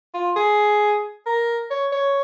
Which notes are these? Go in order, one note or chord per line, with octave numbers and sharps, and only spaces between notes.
F4
G#4
A#4
C#5
C#5